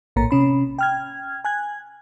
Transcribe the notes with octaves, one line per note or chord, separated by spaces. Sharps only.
A#1 A2 A#3 A#5
C3 C#4 B5
G5 F6 G#6
G#5 F#6 G#6